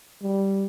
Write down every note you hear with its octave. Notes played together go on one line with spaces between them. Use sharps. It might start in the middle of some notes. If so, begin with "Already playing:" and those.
G3